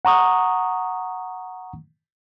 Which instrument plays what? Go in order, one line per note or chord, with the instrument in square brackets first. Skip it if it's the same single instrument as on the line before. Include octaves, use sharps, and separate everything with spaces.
[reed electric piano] F#5 A#5 C#6 D#6